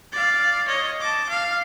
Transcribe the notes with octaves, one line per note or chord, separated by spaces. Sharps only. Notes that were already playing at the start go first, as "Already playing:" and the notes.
D5 F5
C#5 D#5
A5 D6
F5